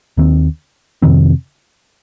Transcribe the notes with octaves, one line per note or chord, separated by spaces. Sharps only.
D#2 D#3 C4
F2 C3 D#3 C4